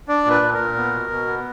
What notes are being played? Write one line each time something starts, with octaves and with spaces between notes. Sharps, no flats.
D4 D5
A#2
B4
A#2
A#2 A#4
B3
B2
B2
B3